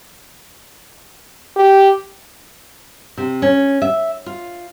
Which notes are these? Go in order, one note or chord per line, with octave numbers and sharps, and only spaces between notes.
G4
C3
C#4
E5
F4